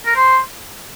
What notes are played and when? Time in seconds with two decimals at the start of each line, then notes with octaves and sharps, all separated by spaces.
0.06 A#4
0.16 C5